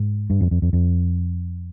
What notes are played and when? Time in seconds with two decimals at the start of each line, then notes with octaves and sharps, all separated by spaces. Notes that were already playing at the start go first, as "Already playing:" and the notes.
Already playing: G#2
0.30 G2
0.41 F2
0.51 F2
0.62 F2
0.73 F2